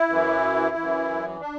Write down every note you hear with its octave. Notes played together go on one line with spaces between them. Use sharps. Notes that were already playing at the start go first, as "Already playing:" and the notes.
Already playing: E4
F#2 E3
F#2 E3
D4